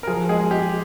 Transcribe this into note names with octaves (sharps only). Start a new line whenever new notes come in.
A#4
F3 G#4
G#3 G#4
G#3 G4